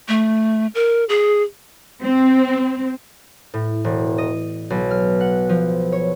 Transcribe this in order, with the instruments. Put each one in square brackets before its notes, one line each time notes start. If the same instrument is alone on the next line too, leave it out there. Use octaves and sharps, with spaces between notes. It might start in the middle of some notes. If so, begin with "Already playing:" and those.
[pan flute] A3
A#4
G#4
[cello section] C4
[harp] A2
E1
D#5
B1
F6
F#5
F3
C#5